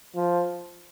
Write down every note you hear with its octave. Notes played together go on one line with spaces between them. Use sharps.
F3